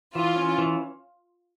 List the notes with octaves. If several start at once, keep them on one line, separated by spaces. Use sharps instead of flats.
E3 F4
C#4
E3